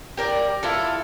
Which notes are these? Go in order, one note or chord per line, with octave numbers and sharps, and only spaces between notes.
G4 A#4 D5
E4 F4 A4